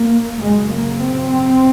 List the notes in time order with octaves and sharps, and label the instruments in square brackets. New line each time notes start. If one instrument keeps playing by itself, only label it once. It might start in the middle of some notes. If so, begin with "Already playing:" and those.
Already playing: [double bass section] A#3
F#2 C#3 G#3
A#3
C4